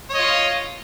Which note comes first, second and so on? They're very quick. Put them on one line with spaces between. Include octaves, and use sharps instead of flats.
C#5 D#5 F4